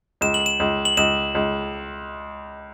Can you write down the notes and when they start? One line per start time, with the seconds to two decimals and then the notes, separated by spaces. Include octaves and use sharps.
0.21 C#2 E7
0.34 F#7
0.46 E7
0.60 C#2
0.85 F#7
0.97 C#2 E7
1.35 C#2